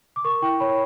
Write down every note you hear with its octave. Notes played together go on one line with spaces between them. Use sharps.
D6
A#4 C#6
E4 G5
C#5 B5